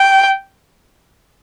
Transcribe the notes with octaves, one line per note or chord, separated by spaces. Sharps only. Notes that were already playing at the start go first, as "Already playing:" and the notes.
Already playing: G5